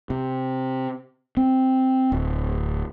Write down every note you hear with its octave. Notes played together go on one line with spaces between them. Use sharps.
C3
C4
D1